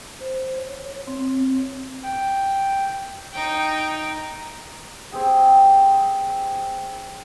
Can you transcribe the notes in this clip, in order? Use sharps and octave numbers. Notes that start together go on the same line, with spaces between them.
C5
C#5
C#5
C4
G5
D#4 G5
C4 G4 G#4 G5